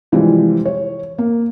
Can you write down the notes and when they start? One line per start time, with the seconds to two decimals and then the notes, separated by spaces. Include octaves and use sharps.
0.12 C3 E3 F3 G3 G#3 C4
0.65 C#5
1.18 A#3